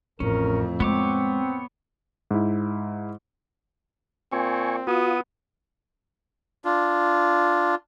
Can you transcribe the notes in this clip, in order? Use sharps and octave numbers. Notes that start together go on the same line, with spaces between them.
A1 F2 A2 C#4 A#4
G#3 B3 C4 C#5 D6
G#2 E4
A#2 C4 G#5 C#6
B3 F4 F#4 D#6
D4 F4